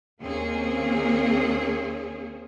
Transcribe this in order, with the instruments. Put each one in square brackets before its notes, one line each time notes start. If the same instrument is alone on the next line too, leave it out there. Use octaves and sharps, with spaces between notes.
[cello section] D#2 A#3 C4 C#4 G#4